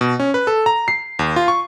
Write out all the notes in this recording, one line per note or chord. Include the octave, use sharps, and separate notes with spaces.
B2
C#4
B4
A4
A#5
C7
D#2
F4
C#6